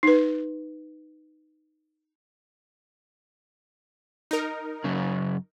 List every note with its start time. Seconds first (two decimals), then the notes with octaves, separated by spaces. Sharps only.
0.03 D#4 B4
4.31 D#4 A#4
4.84 F#2 C#3